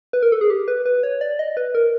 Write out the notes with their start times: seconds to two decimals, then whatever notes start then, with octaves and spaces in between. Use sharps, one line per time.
0.13 B4
0.23 A#4
0.32 A4
0.41 G#4
0.50 G4
0.68 B4
0.86 B4
1.03 C#5
1.21 D5
1.39 D#5
1.57 B4
1.75 A#4